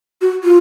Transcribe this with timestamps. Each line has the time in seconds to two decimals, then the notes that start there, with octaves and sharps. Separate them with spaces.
0.21 F#4
0.44 F4